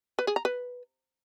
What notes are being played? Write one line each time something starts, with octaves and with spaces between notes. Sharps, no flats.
B4
G#4
A#5
B4